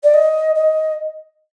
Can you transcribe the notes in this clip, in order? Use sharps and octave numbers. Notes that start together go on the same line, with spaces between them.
D5
D#5
D#5